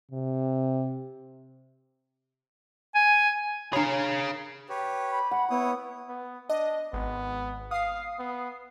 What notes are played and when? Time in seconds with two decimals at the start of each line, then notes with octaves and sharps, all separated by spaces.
0.11 C3
2.95 G#5
3.73 D4 G#4 A#4 C#5 F5 B5
4.69 G4 B4 C#5
5.11 B5
5.31 F#5
5.50 B3 E4 C#5 D#6
6.09 B3
6.49 D4 D#5
6.93 G#1 B3
7.71 F5 D#6 C7
8.19 B3